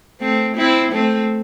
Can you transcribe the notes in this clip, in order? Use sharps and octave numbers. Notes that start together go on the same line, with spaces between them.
A3 C4
C4 E4
A3 C4